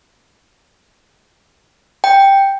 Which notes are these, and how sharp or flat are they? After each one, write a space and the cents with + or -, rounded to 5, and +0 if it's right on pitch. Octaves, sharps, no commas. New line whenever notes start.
G5 +5